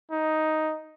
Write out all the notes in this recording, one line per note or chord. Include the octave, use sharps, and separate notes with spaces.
D#4